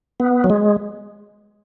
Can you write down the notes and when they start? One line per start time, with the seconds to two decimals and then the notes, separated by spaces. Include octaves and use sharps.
0.20 B3
0.44 F#3
0.50 G#3